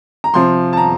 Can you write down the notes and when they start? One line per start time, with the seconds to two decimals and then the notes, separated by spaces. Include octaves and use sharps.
0.24 A#5
0.34 C3 F3 C6
0.73 A5
0.77 A#5